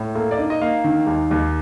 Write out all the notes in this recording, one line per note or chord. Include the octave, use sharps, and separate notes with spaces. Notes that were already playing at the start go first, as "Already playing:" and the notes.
Already playing: A2
A#3 A4
D5
D#4 D#5
D#5
A#3 F5
D#3
D#2
D#2